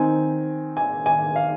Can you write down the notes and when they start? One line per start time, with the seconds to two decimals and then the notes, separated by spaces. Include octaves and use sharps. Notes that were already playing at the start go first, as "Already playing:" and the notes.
Already playing: D#3 C4 D#4 G#5
0.77 G#5
1.06 G#5
1.36 F5